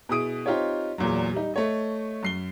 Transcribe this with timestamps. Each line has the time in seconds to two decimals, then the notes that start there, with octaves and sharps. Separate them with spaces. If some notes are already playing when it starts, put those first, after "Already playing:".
0.09 B2 E4 G#4 D#6 D7
0.46 C4 D#4 F4 G4 C#5
0.98 E2 A#2 F#3
1.34 G3 D#4
1.54 A3 C#5 D#5
2.23 F#2 C7 G7